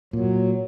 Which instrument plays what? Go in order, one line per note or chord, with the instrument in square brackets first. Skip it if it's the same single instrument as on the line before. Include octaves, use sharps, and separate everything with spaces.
[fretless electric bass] A#2 [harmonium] F#3